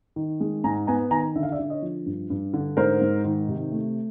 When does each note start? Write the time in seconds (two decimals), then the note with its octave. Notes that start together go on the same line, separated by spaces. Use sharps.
0.16 D#3
0.40 G#3
0.64 G#2 G#5 A#5
0.87 B3 G#5 A#5
1.11 D#3 G#5 A#5
1.35 D3 E5
1.43 F5
1.52 D5 E5
1.59 D3
1.70 C#5 D#5
1.82 F3
2.06 G2
2.30 G2
2.54 D3
2.77 G#2 A#4 C5
3.01 G#2
3.25 D#3
3.48 C3
3.72 A3